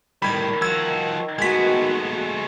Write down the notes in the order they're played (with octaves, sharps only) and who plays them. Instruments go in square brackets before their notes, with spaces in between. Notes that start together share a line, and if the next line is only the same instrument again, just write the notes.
[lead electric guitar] A2 G3 [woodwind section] D#3 [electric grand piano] B5 G#6
[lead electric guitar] F3 F#4 [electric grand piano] E6 G#6
[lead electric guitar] G#3 A3 [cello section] B3 F#4 [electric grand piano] G#6 B6